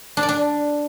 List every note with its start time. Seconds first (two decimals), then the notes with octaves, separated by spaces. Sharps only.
0.17 D4
0.23 D5
0.29 D4